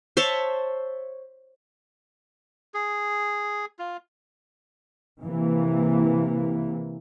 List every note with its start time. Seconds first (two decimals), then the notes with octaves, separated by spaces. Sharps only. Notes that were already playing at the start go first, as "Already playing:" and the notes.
0.17 C5 C#5 E5 A5
2.74 G#4
3.79 F4
5.23 C3 E3 A#3